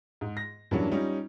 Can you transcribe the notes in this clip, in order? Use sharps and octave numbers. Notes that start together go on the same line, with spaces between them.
G#2
A#6
G2 E3 F#3 A#3 C#4 D4
G3 C#4 D#4 F4